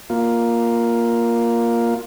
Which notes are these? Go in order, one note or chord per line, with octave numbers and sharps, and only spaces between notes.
A#3 F4